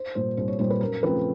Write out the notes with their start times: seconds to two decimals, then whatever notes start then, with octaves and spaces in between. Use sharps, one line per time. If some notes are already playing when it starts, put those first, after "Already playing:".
Already playing: C5
0.15 A#2 G3 C5
0.37 C2 C5
0.48 C#5
0.59 A#2 G3 C5
0.70 B4
0.81 F#2 A#4
1.03 C#3 F3 A3 C4 B4